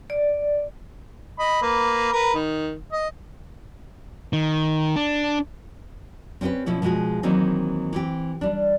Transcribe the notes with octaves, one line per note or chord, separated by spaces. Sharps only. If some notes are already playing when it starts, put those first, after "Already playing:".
D5
D#5 B5
A#3 B4
A#4 B4
D#3
D#5
D#3
D4
C4 C#4 E4 G4 B4
B2 F3 C#4 E4
B2 F3 G#3 F#4 G#4
D#3 E3 F#3 A#3 C4 D#4
E3 C4 G4
G3 D4